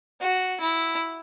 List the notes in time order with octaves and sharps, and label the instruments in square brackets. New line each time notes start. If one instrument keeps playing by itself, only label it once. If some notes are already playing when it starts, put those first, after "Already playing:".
[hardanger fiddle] F#4
E4